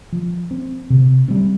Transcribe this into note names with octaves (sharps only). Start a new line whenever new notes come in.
F3
C4
C3
G3 C4